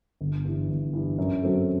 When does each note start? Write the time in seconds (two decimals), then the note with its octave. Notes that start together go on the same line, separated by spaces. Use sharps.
0.21 G1
0.44 G2 E3
0.69 G1
0.93 G2 E3
1.18 F#2
1.42 F#3 C4 F#4 A4